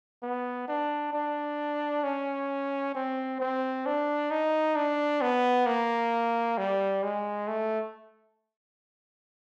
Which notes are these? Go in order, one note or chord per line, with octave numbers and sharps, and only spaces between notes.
B3
D4
D4
C#4
C4
C4
D4
D#4
D4
B3
A#3
G3
G#3
A3